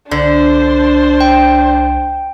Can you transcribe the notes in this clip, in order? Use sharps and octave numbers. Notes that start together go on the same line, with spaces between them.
C2 D3 D4 C5
G5